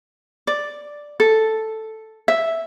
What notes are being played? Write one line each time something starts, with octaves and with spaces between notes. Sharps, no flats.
D5
A4
E5